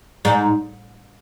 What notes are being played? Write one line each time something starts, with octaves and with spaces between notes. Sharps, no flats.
G#2